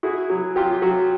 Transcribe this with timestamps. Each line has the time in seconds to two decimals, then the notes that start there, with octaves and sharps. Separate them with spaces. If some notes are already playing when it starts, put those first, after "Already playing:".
0.03 E4 F#4 G#4
0.30 F#3
0.56 F#3 F4 G4
0.82 F#3 F#4